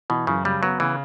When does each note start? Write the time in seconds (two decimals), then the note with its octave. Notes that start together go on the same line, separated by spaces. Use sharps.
0.10 B2 E3
0.27 F#2 C#3
0.45 C#3 G3
0.62 F#3 B3
0.80 C#3 E3